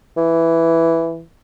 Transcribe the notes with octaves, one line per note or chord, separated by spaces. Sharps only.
E3